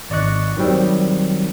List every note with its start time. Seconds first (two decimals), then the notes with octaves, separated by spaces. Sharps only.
0.10 G#1 D5 D#5 C#6 F#6
0.57 D#3 F#3 G3 C4